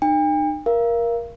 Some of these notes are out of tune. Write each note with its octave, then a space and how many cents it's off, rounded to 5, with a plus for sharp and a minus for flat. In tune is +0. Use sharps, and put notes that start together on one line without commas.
D#4 -40 G5 +45
A#4 +15 F5 -30